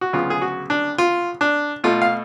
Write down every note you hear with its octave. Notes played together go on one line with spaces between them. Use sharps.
F#4
D2 C#3 F#3 B3 F4
G#4
F#4
D4
F4
D4
B2 A3 F4
F5